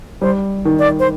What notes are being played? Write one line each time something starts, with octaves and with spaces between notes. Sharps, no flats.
G3 C5
D#3
D5
C5